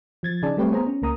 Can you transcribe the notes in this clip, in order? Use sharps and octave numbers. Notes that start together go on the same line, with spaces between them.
F3 G#6 A6
C#3 D#4 G#4 D5 A5
G3 A3 C4 G4 B4 C#5
B3 G#4 C5 A#5
C#4
C#2 A#3 A#5 D#6